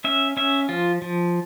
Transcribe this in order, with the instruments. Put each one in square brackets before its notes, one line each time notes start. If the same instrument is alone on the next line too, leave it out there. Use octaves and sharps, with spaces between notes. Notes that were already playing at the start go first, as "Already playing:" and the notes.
[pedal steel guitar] C#4 E5
C#4 E5
F3 F4
F3